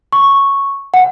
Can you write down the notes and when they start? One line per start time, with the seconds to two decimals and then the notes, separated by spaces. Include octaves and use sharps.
0.13 C#6
0.94 F#5